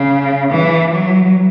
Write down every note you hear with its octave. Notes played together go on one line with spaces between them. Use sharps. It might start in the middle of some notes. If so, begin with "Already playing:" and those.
Already playing: C#3
E3
F#3